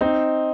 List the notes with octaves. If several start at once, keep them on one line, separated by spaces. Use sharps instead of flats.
C4 D#4